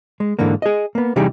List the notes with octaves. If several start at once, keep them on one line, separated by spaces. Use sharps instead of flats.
G#3
G#2 D3 E3 A#3
G#4 D#5
A#3 B3
C3 E3 G3 D#4 G4 G#4